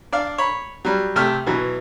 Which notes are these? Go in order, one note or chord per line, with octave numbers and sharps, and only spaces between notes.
D4 D5 F5
C#5 B5
F#3 G3
C3 A3 G4 F6
B2 E3 F#3